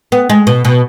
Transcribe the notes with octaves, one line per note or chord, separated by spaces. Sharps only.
B3
G#3
B2
B2